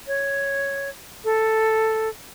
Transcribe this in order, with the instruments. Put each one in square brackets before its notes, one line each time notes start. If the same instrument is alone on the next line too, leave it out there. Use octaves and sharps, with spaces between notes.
[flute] C#5
A4